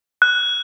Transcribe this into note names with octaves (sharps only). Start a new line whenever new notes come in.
F#6